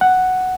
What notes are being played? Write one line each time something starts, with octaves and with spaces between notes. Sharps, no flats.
F#5